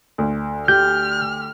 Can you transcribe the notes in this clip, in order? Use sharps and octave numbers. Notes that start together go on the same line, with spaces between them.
D2
G4 F6 G6